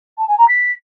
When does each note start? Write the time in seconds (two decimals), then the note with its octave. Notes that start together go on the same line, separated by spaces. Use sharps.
0.18 A5
0.28 G#5
0.38 A#5
0.48 B6